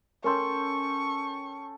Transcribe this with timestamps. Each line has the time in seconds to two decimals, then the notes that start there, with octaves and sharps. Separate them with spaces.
0.24 C#4 A4 A#4 G5 C6 C#6